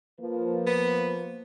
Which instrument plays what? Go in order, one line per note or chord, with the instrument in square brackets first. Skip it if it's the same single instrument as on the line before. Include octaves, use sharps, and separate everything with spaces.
[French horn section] F3 A#3 B4
[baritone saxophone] B3